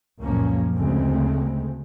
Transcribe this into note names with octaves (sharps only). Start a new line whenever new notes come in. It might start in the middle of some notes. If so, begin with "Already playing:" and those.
C#2 F#2 A#2 F3 A#3 C#4
D2 C#3 G#3 A3 C4